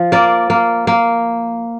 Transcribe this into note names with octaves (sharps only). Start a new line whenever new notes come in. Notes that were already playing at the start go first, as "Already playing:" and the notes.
Already playing: F3
A#3 D5
A#3
A#3